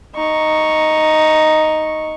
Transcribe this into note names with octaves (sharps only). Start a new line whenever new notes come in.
D#4 C#6